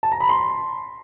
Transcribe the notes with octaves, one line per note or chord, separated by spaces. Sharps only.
A5
A#5
B5
C6